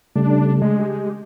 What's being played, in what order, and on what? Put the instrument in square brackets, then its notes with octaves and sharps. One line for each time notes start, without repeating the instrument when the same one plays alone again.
[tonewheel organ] C#3 G3 A3 [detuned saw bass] D4
[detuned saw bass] G#3
[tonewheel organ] G4